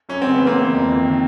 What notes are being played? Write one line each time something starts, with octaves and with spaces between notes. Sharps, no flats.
F#2 C#4
C#3 C4
B3
E3
A#3 C4
E3
F2
F2
D#3